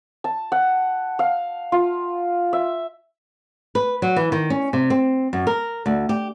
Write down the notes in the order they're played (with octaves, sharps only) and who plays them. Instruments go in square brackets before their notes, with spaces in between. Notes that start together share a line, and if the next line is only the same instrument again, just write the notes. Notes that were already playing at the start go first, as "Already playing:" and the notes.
[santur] A5
F#5
F5
F4
E5
[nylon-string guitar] B4
F#3
E3
D#3
C#4
C3
C4
F#2
A#4
D2
G4